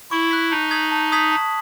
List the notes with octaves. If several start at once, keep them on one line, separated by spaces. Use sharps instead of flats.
E4 C#6
F#6 B6
D#4 A5
D#6 G#6 B6 F#7
A5
D#6 G#6 B6 F#7
A5